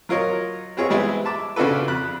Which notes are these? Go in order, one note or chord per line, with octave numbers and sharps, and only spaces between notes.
F#3 F4 A#4 C#5 D#5
B3 C4 F4 G#4 C#5 D#5
E3 G3 G#3 B3 C4 E4
E5 A5 D6
C#3 D4 F4 F#4 A4 B4
F2 B5 F#6